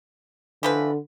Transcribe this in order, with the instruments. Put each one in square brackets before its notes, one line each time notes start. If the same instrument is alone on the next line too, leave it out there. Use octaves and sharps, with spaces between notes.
[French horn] D3 [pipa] E3 F3 B4